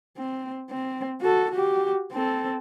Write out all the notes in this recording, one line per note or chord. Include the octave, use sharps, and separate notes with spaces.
C4
C4
F#4 A4
F#4 G4
C4 A4